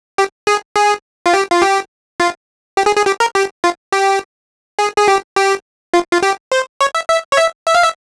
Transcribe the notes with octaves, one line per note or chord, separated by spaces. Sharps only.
G4
G#4
G#4
F4
G4
F4
G4
F4
G4
G#4
G#4
G4
A#4
G4
F4
G4
G#4
G#4
G4
G4
F4
F4
G4
C5
C#5
E5
E5
C#5
E5
E5
F5
E5